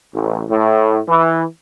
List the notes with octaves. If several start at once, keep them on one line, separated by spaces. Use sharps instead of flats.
A1
A2
E3